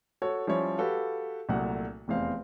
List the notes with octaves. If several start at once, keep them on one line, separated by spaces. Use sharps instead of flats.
F#4 A4 C#5
F3 G3 C#4 E4 C#5
F#4 G4 A4 B4 F5
C2 A#2 F#3 A3 F#5
F1 E2 C4 F5